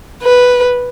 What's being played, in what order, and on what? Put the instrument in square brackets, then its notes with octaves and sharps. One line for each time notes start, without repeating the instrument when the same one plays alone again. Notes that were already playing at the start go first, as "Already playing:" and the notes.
[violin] B4